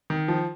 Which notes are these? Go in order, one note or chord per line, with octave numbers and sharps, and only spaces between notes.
D#3
F3